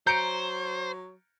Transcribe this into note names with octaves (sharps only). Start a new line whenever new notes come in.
F#3 C5 A#5 G6 C#7 D7